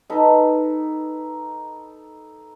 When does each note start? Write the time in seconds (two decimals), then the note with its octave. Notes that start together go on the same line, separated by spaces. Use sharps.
0.10 D#4 A4 B4